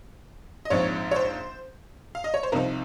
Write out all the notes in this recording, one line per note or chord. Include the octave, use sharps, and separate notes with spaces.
D#5
A#1 G#2 F3 C4 C#5
C#5
C5
F5
D#5
C#5
C5
C2 C3 F3 C4 D#4 A#4